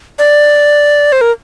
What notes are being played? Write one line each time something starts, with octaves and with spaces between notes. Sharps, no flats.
D5
C5
A#4